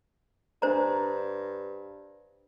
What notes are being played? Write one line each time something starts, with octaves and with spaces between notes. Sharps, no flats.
G2 D4 C5 A#5